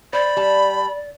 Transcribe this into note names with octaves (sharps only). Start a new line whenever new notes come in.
C5 D5 B5
G3 A5